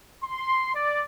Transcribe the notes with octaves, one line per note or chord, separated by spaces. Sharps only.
C6
D5